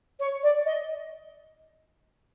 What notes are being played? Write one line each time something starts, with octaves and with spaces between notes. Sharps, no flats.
C#5
D5
D#5